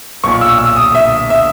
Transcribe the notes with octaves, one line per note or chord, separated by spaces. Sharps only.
B1 A#2 C#6
E6
E6
D#6
E5
E5